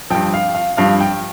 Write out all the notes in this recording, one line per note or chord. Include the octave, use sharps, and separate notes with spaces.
G2 F3 G5
F5
F5
G2 F3 F5
G5